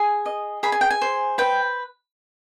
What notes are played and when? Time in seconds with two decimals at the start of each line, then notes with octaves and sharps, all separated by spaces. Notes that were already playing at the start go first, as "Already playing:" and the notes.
Already playing: G#4 G#5
0.26 D#5
0.63 G#4 B5
0.72 G#5
0.81 G5
0.90 G#5
1.01 C5
1.38 B4 G5